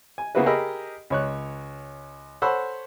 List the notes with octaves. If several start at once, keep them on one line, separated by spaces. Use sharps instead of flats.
G#5
C#3 A#3 B3 E4 F#4 B4
G4 G#4 A#4 D#5 B5 E6
C#2 C#5 F#6
A4 C5 C#5 F#5 B5 E6